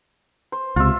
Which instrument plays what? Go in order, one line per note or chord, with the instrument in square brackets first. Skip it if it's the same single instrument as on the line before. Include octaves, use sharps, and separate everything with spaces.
[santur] C5
[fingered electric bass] C#2 C3 [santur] F4 E5